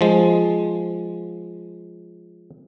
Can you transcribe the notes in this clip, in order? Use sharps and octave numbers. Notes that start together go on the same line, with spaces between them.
F3 G#3